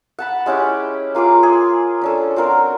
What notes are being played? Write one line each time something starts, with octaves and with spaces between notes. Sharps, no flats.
F#5 A5 B5
G#3 C#4 E4 G4
A#3 F4 G#4 D6
G#4 C6
C#4 D4 A4
C4 F#4 A#4 C6